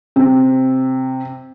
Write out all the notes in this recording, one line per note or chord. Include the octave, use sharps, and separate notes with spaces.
C3